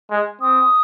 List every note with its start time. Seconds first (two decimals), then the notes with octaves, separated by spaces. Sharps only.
0.11 G#3
0.41 C4 D#6